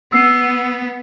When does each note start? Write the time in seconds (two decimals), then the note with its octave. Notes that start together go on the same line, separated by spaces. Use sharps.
0.12 B3 E6 C7